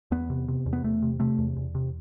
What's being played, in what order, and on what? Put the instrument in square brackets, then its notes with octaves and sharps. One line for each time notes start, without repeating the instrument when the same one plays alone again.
[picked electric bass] E2 B3
C3
C3
E2
B3
E2 A3
C3
C3 A3
E2
E2
C3